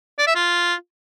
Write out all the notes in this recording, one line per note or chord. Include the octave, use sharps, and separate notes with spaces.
D5
E5
F4